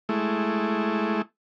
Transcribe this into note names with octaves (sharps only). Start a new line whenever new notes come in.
G#3 A3 E4